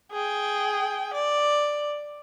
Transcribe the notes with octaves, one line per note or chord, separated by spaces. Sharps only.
G#4 G5
D5